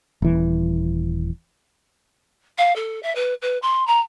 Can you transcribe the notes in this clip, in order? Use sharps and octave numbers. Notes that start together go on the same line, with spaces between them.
D#1 E3
F5
A4
E5
B4
B4
C6
A#5